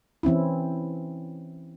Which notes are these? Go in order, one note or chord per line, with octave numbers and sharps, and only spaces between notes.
E3 C4 C#4 E4